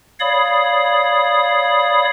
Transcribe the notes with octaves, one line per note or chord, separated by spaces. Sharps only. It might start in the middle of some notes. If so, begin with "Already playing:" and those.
C#5 D5 F5 B5 D#6